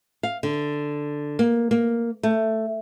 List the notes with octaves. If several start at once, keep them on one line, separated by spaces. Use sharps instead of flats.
F5
D3
A#3
A#3
A3